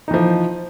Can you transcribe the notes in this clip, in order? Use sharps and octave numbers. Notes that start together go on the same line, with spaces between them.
E3 F3 D#4